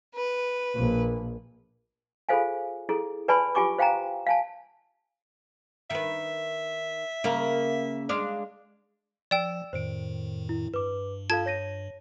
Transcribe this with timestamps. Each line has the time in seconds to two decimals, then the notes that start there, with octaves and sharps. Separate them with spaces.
0.15 B4
0.76 A#1
2.29 F4 G#4 A4 C5 F5 G#5
2.89 E4 G#4 A4
3.28 B4 D5 G#5 A5 B5 C6
3.55 F4 G4 G#5 C#6 D6
3.78 C5 F5 G5 G#5 A#5
4.27 F5 G#5 A5
5.90 D#3 B4 E5
7.24 C#3 A#3 A#4
8.09 G#3 D4 F5
9.31 F3 D5 G5 E6 E7
9.73 F2 A2 D#3 C5 D7
10.49 E4
10.74 G2 B4 D6
11.30 F4 A4 F5 A5 G#6
11.46 C#5 A#6 D#7